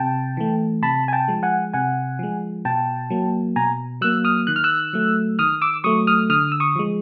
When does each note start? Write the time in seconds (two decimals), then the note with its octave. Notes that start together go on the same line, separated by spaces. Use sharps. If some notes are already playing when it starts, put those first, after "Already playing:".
Already playing: C3 G5 A5
0.37 E3 A3
0.82 C3 A5 B5
1.08 G#5
1.13 G5 A5
1.28 F3 G#3
1.43 F#5 G#5
1.73 C3 F#5 G#5
2.19 F3 G#3
2.65 B2 G5 A5
3.10 F#3 A#3
3.56 B2 G#5 A#5
4.01 F#3 A#3 E6 F#6
4.25 D#6 F6
4.47 D#3 F#6
4.56 F6
4.64 E6 F#6
4.93 F#3 A3
5.39 D#3 D#6 F6
5.62 D6 E6
5.84 F#3 A3 C#6 D#6
6.07 D#6 F6
6.30 D3 D#6 F6
6.52 E6
6.60 C#6 D#6
6.76 F3 G#3